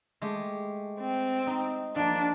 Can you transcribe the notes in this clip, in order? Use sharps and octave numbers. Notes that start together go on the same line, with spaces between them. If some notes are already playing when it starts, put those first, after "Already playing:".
G#3 A3 G4
C4
D#4
F3 A#3 D4